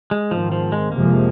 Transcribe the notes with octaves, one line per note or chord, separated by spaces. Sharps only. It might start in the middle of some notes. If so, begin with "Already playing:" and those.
G#3
G#2 D#3 F3 C4
F3
G#3
F2 C3 F3 G#3 A#3